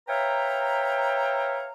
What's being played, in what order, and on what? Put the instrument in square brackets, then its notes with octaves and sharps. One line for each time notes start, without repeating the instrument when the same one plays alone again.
[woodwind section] B4 C#5 E5 F5 G5 A#5